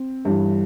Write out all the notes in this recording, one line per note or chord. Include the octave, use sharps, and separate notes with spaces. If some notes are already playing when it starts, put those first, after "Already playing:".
Already playing: C4
G1 G2 E3